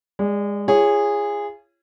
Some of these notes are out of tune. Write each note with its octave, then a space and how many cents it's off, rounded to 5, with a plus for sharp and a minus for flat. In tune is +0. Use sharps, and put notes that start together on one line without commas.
G#3 -25 D5 +0
F4 -40 G#4 -15 C#5 +0